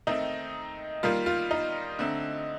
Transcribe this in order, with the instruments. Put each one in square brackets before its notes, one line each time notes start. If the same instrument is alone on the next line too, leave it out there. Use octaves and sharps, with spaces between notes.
[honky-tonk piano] D#3 A3 C4 D#4
D#3 G3 A#3 F4
F4
D#4
D3 A3 C4